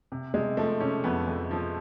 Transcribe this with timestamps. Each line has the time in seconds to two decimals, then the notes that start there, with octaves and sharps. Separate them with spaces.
0.12 C3
0.34 C3 G#3
0.57 F3 A3
0.80 C3 C#4
1.04 F2 B3
1.27 F2
1.51 F3